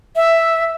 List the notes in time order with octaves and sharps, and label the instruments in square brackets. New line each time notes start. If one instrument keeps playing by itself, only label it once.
[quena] E5